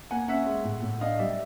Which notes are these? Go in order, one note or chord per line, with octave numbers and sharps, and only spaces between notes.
A#3 F#5 G#5
C#4 E5 F#5
G#3
A2
A2
D4 D#5 F5
G3 D5 E5